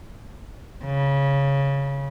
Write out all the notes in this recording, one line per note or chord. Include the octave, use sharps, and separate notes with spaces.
C#3